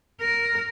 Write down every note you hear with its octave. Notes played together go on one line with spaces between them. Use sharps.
A#4